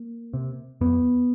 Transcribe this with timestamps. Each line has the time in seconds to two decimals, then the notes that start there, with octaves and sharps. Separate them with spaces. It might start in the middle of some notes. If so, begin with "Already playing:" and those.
Already playing: A#3
0.33 C3
0.81 F2 B3